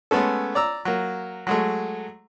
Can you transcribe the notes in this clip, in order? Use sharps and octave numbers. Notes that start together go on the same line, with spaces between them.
G#3 A3 B3 C#4 A4
D5 A#5 E6
F#3 A#3
F#3 G#3 A3